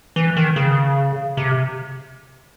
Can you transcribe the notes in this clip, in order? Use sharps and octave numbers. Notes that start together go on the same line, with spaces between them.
E3
D#3
C#3
C3